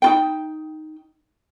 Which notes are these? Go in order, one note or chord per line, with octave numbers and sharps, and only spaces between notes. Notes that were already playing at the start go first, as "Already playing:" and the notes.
D#4 F4 G5